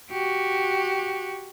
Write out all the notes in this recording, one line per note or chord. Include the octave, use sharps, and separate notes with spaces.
F#4 G4